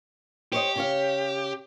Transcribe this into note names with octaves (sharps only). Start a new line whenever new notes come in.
G4 C5 C#5 D#5
C#3 C#5 F5